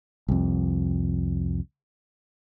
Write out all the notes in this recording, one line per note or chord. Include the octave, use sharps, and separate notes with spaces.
C2 F2